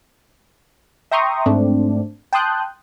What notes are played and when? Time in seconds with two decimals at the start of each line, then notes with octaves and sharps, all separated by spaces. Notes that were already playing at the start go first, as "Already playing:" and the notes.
1.11 E5 G5 A#5 C6 C#6 D#6
1.46 G#2 A3 C4 D4
2.33 G5 A5 C6 D#6 F#6 G6